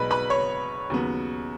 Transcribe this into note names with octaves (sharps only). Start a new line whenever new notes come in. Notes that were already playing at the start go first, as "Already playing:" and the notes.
Already playing: B1 B2 G#3 D#4 B4 B5
B4 B5
C#5 C#6
D#2 C#3 F#3 B3